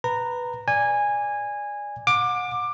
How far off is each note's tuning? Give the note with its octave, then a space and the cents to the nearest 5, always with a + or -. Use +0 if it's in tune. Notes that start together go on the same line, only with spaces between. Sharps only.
B4 +0 A#5 -15
D5 +0 G#5 -15
F#5 -35 D6 +15